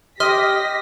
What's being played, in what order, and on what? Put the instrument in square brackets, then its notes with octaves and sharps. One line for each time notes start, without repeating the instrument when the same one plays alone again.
[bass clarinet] G4 [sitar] D#5 [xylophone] C6 F6 [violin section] A#6 B6